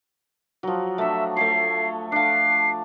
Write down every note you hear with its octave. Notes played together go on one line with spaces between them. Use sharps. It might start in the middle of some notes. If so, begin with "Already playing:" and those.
F3 F#3
A3 D4 E5
A3 A4 C#5 C7
D4 F5 C7